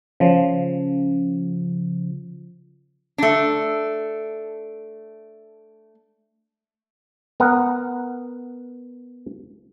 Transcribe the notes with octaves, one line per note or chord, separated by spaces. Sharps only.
C#3 F3
A3 D4
B3 A#4 F#5